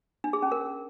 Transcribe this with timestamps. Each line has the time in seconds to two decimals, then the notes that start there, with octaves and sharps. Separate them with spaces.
0.24 D4
0.33 G#4
0.42 C#4
0.52 A#4